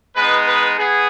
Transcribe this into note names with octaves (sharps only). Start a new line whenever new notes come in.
G#3 B3 D#4 B4
B4
B3 G#4